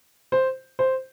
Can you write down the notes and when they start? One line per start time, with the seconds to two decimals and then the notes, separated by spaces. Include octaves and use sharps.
0.32 C5
0.79 C5